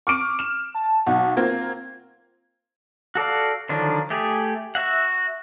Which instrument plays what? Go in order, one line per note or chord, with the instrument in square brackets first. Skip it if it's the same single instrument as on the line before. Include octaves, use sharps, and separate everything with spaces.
[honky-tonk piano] C#6 D6 D7 [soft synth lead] F6
[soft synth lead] F6 [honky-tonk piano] E7
[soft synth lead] A5
[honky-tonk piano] B1 [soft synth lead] F#5
[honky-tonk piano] A#3 C4 F4 [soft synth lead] G#6
[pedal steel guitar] F#4 A4 D5 F5
D3 D#3 F3 F#3 D4
A3 G4 G#4
F#4 E5 F#5